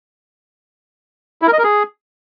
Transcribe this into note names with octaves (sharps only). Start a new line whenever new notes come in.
E4
A#4
D#5
A#4
G#4